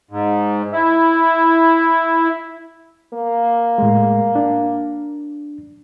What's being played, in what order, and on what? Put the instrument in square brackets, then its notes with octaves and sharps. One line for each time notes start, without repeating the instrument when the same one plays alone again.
[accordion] G#2
E4
[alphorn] A#3
[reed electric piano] A2 G#3
D4